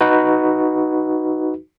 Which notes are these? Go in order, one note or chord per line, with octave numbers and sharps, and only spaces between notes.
D#4 F#4 B4